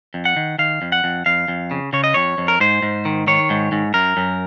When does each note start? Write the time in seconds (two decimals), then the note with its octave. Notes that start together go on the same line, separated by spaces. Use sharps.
0.14 F2
0.25 F#5
0.36 D#3
0.59 D#3 F5
0.82 F2
0.92 F#5
1.04 F2
1.26 F2 F5
1.48 F2
1.71 C#3
1.93 C#3 C#5
2.04 D#5
2.14 F2 C#5
2.38 F2
2.48 A#4
2.60 G#2 C5
2.83 G#2
3.05 D#3
3.27 D#3 C#5
3.50 G#2
3.72 G#2
3.94 F#2 A#4
4.17 F#2